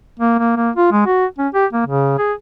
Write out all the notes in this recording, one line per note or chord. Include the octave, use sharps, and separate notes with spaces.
A#3
A#3
A#3
F4
G#3
F#4
C#4
G4
A#3
C#3
G#4